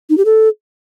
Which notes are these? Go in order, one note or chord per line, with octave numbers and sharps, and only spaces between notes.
D#4
G4
A4